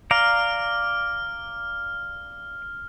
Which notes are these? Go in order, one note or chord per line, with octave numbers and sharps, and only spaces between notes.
D5 F5 A#5 F6